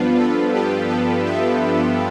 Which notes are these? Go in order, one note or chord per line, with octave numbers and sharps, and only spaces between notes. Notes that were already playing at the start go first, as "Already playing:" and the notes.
Already playing: G2 F3 B3 D4 F4 B4
A4
G4
A4
E5